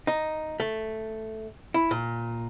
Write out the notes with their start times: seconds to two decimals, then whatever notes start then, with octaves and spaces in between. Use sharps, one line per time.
0.07 D#4
0.60 A3
1.74 E4
1.91 A#2